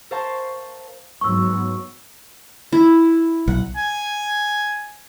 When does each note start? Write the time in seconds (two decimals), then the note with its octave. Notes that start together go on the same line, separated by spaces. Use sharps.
0.11 A#4 C5 F5 A5 C#6
1.21 G#2 F#3 B3 C#6 E6
2.72 E4
3.48 B1 F#5
3.76 G#5